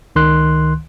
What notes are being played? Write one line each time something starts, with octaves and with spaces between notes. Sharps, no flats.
C#2 D#3 C6 F#6